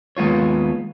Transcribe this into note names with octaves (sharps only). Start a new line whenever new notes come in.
D#2 G#3 B3 F4 C#5